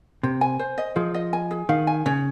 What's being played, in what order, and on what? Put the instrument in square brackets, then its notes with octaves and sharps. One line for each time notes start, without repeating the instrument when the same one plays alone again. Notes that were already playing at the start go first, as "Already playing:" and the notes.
[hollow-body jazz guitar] C3 [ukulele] C5
[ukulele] G#5
C5
D#5
[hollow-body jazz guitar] F3 [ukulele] G#4
[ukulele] D#5
G#5
G#4
[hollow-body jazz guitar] D#3 [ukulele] F5
[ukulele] G#5
[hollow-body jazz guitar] C#3 [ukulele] C#5